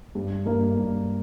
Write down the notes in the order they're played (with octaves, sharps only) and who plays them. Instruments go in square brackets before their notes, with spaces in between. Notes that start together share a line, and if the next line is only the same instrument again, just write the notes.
[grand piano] G2 G4
G2 A#3 A#4
G2